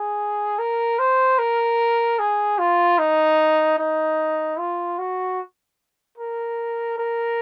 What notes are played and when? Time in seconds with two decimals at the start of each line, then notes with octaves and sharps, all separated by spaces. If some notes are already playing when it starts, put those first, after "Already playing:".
Already playing: G#4
0.59 A#4
0.99 C5
1.39 A#4
2.19 G#4
2.59 F4
2.99 D#4
3.79 D#4
4.59 F4
4.99 F#4
6.18 A#4
6.98 A#4